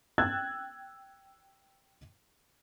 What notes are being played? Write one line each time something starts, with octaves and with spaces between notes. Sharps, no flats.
G5 E6 F#6 G#6 A6